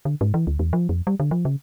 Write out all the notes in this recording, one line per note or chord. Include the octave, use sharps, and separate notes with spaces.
D3
G#2
E3
D2
E2
F3
F2
G3
D3
F3
C#3